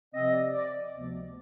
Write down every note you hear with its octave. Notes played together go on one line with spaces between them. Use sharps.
C3 F3 C4 D#5
D5
D5
D2 C3 F3 B3